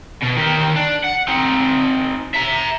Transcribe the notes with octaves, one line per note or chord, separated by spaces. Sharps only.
B2
D#3 G4
D4
F#5
C4 D#4
E5 A#5